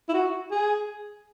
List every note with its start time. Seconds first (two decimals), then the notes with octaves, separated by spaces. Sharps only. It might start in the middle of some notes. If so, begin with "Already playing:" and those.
0.09 E4
0.13 F#4
0.51 G#4